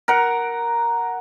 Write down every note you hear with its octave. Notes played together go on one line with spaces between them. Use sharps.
A#4 F#5